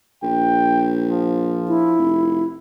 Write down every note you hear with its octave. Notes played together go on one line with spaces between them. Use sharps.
A#1 G5
F3
E4
F1